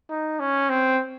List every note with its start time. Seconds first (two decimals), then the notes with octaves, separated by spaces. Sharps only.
0.10 D#4
0.40 C#4
0.70 C4